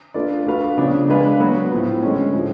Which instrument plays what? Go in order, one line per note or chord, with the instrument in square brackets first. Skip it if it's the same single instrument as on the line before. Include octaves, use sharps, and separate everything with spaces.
[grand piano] A3 D4 F4 B4 D5
A3 D4 F#4 B4 F5
C#3 F3 B3 D4
G#3 D4 G#4 B4 F5
F#3 B3 F#4 B4
A2 F3 B3
D3 G#3 C#4
A2 F3 G#3